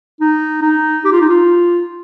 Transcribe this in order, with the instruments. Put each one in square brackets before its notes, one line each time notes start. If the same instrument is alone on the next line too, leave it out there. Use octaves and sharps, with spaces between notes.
[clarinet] D#4
D#4
G4
F4
D#4
F4